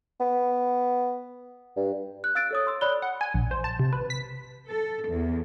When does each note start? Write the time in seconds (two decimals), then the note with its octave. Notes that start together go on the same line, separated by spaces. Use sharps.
0.20 B3
1.76 G2
2.24 F#6
2.35 F5 E6 F#6 A6 D7
2.51 A4 C#5 D#6
2.67 C6 E6
2.81 C#5 D5 B5 F#6 G7
3.02 F#5
3.21 G#5
3.34 A#1
3.51 C5
3.64 A5
3.79 C3
3.93 B4
4.10 B6
4.65 A4
5.08 E2